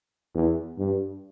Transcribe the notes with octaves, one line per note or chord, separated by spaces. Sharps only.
E2
G2